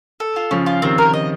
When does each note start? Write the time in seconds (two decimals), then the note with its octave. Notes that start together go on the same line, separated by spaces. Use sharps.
0.20 A4
0.36 F4
0.51 C#3 F3 C#4
0.66 F4
0.82 C3 D#3 C4
0.98 A#4
1.14 D#5